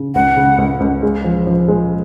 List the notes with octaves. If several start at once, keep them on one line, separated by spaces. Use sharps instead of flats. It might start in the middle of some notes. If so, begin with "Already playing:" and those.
Already playing: C#3
C#2 F#5
C#3
C#2
C#2
G#3
F3
F3
G#3